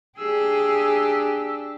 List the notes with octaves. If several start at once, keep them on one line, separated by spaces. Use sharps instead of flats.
D4 G4 G#4 E6